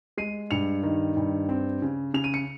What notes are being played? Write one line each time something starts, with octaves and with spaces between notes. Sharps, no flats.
G#3 C7 D#7
G2 C#7 F7
D#3
G2
C4
C#3
C#3 F7
D#7
C#7